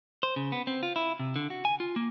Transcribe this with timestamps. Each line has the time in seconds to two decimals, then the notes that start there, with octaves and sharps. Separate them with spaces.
0.23 C5
0.36 C#3
0.52 B3
0.67 C4
0.83 F4
0.96 E4
1.19 C3
1.36 D3
1.50 F#4
1.65 G#5
1.80 F4
1.96 A#3